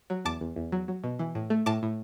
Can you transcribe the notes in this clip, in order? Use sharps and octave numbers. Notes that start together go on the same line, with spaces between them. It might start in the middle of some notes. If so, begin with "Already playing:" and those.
F#3
E2 A5 D6
E2
E2
F#3
F#3
B2
E3
A2
A3
A2 A5 D6
A2